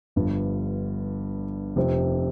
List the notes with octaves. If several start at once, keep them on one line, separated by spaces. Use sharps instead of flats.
G1 G2 F3
F1 F2 C3 F3 C4